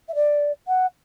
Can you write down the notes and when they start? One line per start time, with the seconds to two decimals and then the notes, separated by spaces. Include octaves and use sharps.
0.08 E5
0.15 D5
0.67 F#5